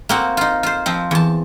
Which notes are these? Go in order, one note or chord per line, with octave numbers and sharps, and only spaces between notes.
A#3 C4 F#4
D#4 F4
F4 C5
F3 C4
E2 A5